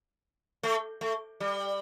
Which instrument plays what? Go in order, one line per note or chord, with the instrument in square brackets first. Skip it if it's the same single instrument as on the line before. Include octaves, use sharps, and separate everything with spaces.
[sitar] A3
A3
G3